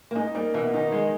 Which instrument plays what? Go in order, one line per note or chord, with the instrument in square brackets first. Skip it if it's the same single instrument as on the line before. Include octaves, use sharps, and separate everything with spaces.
[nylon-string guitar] A#3
[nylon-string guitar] G#3 [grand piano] D#4
[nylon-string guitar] G3 [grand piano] A#3
[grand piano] B2 [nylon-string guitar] E3
[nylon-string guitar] D#3 [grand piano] D#4
[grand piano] G#3